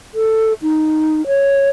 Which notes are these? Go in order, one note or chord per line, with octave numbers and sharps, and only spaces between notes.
A4
D#4
C#5